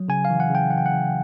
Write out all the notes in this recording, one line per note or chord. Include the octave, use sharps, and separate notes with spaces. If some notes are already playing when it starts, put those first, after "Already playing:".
Already playing: F#3
C#3 G#5
F5
E3
F#5
C#3
G5
E3 F#5
G5
F#5
C#3